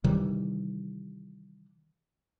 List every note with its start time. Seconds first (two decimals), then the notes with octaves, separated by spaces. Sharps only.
0.04 C3 D#3 E3 G3